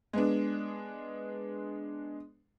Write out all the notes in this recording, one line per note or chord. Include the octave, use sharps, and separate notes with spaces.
G#3 B3 D4